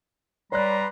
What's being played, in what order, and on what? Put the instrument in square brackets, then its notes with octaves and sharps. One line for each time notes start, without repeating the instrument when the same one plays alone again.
[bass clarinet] G3 [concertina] B4 C6 [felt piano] C#5 D5 F#6 [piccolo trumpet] A#5